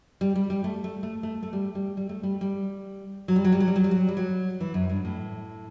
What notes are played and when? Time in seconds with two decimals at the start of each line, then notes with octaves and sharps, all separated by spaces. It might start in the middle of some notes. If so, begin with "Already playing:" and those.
0.21 G3
0.35 G3
0.50 G3
0.64 A3
0.84 A3
1.03 A3
1.23 A3
1.43 A3
1.53 G3
1.75 G3
1.97 G3
2.09 A3
2.23 G3
2.41 G3
3.28 F#3
3.36 G3
3.44 F#3
3.52 G3
3.60 F#3
3.68 G3
3.76 F#3
3.84 G3
3.91 F#3
4.08 G3
4.17 F#3
4.60 E3
4.74 F#2
4.90 G2
5.05 A2